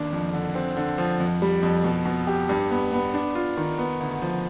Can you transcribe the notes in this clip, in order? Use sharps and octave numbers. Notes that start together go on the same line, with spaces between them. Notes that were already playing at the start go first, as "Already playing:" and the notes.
Already playing: D#2 D4
F2
D3
C4
D3
F3
F2
G3
F2
B2
B2
G4
G2
B3
B3
D4
F4
D#3
B3
D2
F3